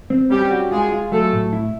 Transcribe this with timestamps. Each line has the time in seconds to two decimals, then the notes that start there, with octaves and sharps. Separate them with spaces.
0.10 C4
0.30 G3 C#4 G4
0.51 F#4
0.71 G#3 F4 G#4
0.92 F4
1.12 F#3 A3 A4
1.32 A2
1.53 E4